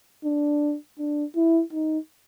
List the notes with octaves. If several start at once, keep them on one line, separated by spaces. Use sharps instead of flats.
D4
D4
E4
D#4